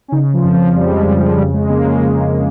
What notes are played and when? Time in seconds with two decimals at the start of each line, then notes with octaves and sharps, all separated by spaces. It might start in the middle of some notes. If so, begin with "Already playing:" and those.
0.08 C#4
0.12 C#3 D#4
0.34 F3
0.43 F2
0.54 F3
0.75 F2 G3
0.86 G#3
0.96 G3
1.06 F2
1.17 F3
1.38 C#3 G3
1.54 G#3
1.69 C#3 A#3
1.85 G#3
2.01 C#3